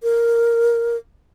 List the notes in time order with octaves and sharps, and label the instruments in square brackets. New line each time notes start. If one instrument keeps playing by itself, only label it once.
[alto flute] A#4